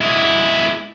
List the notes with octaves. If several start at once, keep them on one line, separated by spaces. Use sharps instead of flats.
G#3 E4